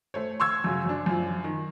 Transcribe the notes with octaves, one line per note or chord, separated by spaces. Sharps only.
A3 C5 C#5
C6 C#6 E6 G#6
F#2 C#3 F#3
F#2 D4
F#2 F3
D#3